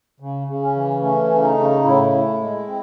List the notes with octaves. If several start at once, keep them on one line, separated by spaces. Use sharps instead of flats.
C#3
C#3
C#4
E3
A3 C#4
C#3
D#4
C#3
A2 E4
A2
G#3
C4